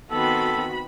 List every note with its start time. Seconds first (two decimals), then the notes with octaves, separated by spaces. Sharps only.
0.11 D#3 B3 C4 F#4 A4 B5